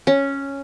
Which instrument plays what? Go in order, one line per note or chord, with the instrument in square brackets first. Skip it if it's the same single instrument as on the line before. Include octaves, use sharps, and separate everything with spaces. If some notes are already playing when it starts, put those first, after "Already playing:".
[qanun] C#4